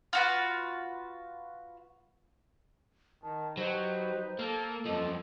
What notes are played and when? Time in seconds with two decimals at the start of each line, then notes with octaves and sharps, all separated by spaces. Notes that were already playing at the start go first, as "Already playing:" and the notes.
0.13 F4 F#4 B4
3.23 D#3 A5
3.57 F#3 D#4 G4 B4 C5
4.39 A#3 A4
4.86 F#2 F3 D#5